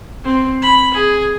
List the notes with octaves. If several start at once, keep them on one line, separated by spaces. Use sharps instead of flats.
C4
B5
G#4